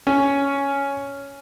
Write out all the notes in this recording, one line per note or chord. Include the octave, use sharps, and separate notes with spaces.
C#4